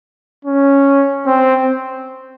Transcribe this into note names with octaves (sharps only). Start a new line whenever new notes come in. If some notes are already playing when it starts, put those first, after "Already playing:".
C#4
C4